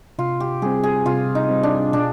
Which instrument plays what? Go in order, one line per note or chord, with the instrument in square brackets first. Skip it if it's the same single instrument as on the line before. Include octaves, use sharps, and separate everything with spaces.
[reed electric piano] C3 [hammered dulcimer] F4
[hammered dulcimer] G4
[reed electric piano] G3 C4 [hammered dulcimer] G#4
[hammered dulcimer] G#4
[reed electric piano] C3 [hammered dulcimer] F4
[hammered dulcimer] D#4
[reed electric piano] G3 C4
[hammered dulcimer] D4
[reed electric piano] B2 [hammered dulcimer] D4